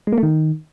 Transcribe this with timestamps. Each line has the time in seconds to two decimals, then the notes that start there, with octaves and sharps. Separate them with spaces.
0.07 G#3
0.12 A#3
0.18 A3
0.23 D#3